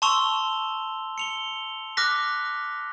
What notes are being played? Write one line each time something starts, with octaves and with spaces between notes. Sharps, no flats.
A5 C6 C#6 E6 F7 G7
C#7 F7 G7
D6 F6 F#6 A#6 B6